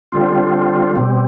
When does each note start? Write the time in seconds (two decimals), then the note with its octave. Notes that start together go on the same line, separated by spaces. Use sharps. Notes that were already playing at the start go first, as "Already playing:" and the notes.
0.12 D3 G3 C4 F4
0.95 B2 G3 C4